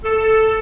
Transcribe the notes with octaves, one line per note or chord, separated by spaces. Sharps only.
A4